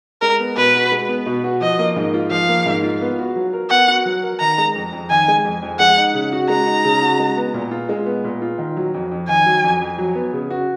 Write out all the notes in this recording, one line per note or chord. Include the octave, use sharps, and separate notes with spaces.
G#3 A#4
B3
B2 B4
F#4
G#3
B3
B2
F#4
F3 D#5
A#3
G#2
F4
F3 F5
A#3
G#2
F4
B3
F#4
F#3
A#4
B3 F#5
F#4
F#3
A#4
D#3 A#5
G#3
F2
F2
D#3 G#5
G#3
F2
F2
G#3 F#5
D#4
C#3
F#4
G#3 A#5
D#4
C#3
F#4
G#3
B3
A#2
F4
G#3
B3
A#2
F4
D#3
F#3
F2
F2
D#3 G#5
F#3
F2
F2
F#3
B3
C#3
F#4